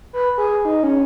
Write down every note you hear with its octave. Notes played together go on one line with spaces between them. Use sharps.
B4
G#4
D#4
C#4